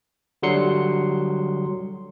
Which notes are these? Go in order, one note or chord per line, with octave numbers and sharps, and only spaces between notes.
D3 F#3 G3 C6 C#7